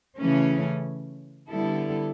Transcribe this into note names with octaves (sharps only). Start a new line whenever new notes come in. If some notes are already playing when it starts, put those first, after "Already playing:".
C#3 E3 A3 C#4
D3 G3 B3 E4 A4